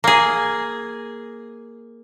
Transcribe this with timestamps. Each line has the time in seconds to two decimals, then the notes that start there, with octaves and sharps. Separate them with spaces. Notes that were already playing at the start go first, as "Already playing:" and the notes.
0.04 A#3 G#4